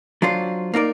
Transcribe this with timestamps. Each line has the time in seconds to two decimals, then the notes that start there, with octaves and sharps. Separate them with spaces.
0.22 F#3 D4 F4 C5
0.74 A#3 D#4 A#4 D5